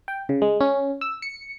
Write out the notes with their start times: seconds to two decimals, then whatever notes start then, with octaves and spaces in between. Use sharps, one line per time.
0.08 G5
0.29 C#3
0.42 G#3
0.61 C#4
1.01 E6
1.22 C#7